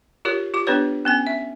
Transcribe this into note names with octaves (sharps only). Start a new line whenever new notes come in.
F4 G4 A#4 C#5
F4 G4 D6
B3 D4 G4 B4 C#5
B3 C#4 G#5
E5